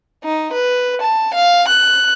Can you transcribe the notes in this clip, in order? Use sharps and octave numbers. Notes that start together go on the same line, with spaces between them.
D#4
B4
A5
F5
F#6